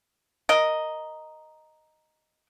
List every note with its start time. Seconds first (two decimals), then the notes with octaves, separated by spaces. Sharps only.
0.49 A#4 D#5